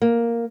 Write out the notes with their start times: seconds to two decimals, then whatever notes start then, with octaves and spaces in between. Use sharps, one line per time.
0.02 A#3